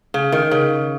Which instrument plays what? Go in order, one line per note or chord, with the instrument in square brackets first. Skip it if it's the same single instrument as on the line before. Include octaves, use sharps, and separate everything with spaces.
[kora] C#3
D#3
C#3